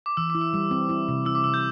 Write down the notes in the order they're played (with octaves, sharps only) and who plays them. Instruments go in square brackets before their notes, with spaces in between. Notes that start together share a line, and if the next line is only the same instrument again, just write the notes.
[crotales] D6
[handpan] E3 [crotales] E6
[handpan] E4 [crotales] D6
[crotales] E6
[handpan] G3
C4
E4
C3
[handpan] E4 [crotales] E6
[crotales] D6
[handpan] C3 [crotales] E6
[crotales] G6